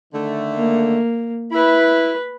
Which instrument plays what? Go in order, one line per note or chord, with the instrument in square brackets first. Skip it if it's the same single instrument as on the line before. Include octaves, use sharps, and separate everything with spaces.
[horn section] D3 D#3 A3
[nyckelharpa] A#3
[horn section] E4 [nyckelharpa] B4 B5